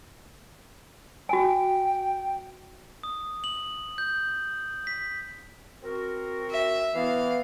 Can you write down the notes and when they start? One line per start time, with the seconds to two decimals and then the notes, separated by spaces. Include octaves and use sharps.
1.29 F#4 G5 G#5
3.03 D#6
3.44 F#7
3.98 G6
4.87 B6
5.84 C4 F#4 A#4
6.50 E5
6.95 E3 B3 F5